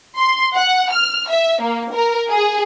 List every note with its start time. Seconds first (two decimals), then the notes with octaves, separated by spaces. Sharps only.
0.17 C6
0.55 F#5
0.91 F6
1.29 E5
1.61 A#3
1.93 A#4
2.30 G#4